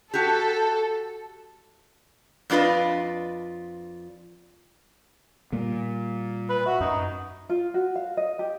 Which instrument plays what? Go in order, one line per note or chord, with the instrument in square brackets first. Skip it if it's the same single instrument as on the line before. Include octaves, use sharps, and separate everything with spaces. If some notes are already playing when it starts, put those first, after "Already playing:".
[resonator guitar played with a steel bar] F#4 G4 [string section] A4
[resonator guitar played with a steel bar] F2 D4 F4 B4 D#5
[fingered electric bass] A#2 A#3 [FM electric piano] G3
[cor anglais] B4
[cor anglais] F#4 [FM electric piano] E5
[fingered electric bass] F#2 [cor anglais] D#4
[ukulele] F4
F#4
F5
D#5
G4